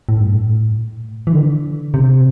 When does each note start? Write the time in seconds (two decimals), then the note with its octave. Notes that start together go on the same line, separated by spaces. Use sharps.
0.09 A2
0.21 G2
0.32 A2
1.27 E3
1.32 D3
1.94 C3